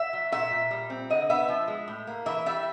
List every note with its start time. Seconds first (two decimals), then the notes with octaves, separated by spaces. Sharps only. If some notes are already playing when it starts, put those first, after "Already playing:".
Already playing: E5
0.13 F#3
0.32 A#2 E5
0.51 A#2
0.71 G3
0.90 C4
1.10 D3 D#5
1.30 B3 E5
1.49 F3
1.68 G#3
1.88 A2
2.07 A#3
2.26 E3 E5
2.46 G3 E5